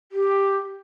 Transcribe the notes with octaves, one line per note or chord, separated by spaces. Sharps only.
G4